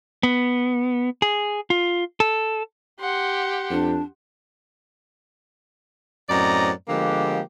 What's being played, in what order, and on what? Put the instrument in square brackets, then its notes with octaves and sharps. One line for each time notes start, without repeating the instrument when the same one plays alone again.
[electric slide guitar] B3
G#4
F4
A4
[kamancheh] G4 [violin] F#5 C6
[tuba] F2 [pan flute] D4
[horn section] F#2 A2 C4 D5 D#5 A#5
D3 F3 G#3 A#3 B3 G4